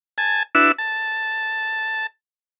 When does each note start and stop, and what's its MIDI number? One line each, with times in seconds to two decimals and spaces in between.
0.18 0.43 80
0.18 0.43 81
0.55 0.72 62
0.55 0.72 64
0.55 0.72 66
0.55 0.72 71
0.55 0.72 76
0.78 2.07 81